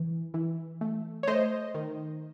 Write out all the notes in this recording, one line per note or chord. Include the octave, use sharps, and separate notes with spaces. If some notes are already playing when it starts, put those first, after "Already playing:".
Already playing: E3
E3
A3
C#5
A3 C5 D#5
D#3